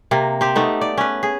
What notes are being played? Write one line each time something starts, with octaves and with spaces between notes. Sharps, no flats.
C3 A#3
C4 G4
A3 B3 D#4
D5
C#4 B4
G#4